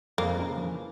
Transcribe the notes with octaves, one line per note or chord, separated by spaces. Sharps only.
F2 F3 A#3
C#3
F3
E3